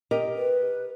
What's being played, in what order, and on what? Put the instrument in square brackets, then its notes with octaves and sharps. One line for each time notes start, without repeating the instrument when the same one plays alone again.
[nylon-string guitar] G4 A#4 D#5
[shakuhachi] B4